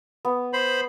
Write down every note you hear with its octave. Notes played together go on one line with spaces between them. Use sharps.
B3
C5 B5